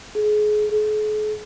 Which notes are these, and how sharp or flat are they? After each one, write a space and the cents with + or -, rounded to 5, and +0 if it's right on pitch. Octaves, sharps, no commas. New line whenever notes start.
G#4 +30
G#4 +45